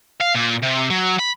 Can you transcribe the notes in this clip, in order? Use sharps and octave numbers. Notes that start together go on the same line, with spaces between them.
F5
A#2
C3
F#3
B5